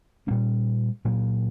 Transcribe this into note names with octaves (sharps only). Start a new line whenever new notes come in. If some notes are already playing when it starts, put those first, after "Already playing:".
A#2 G3 A#3 C#4
A#2 F#3 A#3